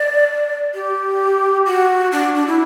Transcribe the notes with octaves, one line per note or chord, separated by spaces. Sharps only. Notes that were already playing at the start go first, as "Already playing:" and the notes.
Already playing: D5
G4
F#4
D4
D4
E4